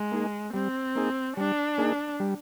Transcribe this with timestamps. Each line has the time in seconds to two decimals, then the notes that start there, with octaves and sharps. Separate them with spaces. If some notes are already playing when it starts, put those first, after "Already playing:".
Already playing: G#3
0.12 A#3 D#4 G#4
0.53 G3 C4
0.95 A#3 D#4 G#4
1.37 G3 D4
1.78 A#3 D#4 G#4
2.20 G3